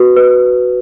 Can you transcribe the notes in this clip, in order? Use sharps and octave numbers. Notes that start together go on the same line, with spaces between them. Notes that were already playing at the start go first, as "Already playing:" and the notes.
Already playing: F#4 B4
B4